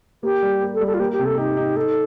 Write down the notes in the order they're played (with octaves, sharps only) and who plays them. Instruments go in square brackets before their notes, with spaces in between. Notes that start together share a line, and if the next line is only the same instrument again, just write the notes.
[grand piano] A#3 [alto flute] G4
[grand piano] G3
A#3
[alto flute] A4
[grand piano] G3
[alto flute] A4
F4
[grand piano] A#3 [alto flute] G4
[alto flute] G4
[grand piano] C3
[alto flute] A4
[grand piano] D#4 [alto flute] G4
[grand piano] D#4
[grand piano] D#4 [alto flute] A4